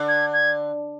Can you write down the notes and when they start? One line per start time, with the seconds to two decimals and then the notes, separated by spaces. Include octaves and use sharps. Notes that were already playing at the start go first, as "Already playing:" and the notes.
Already playing: D3
0.08 G#6
0.33 G#6